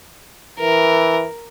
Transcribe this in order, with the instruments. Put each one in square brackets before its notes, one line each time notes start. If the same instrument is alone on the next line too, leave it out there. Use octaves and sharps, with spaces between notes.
[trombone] E3 [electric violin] A#4